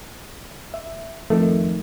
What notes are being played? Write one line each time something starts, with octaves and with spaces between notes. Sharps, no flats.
E5
F2 D#3 A3